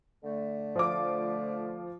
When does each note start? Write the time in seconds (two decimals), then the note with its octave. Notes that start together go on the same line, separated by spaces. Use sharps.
0.23 D3 A3
0.75 F3 F4 D6